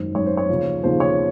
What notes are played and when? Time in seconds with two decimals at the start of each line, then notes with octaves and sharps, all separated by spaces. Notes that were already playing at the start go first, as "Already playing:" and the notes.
Already playing: G#1 F#2 D#3 C5
0.15 G#1 F#2 D#3 C#5
0.26 C5
0.37 C#5
0.49 D#2 C#3 F3
0.84 D#2 C#3 F3 C5
1.00 C#5